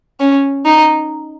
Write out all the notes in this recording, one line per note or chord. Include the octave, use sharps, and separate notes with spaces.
C#4
D#4